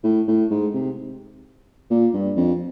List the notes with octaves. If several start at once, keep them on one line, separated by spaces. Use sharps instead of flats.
A2
A2
G#2
C3
A#2
G2
F2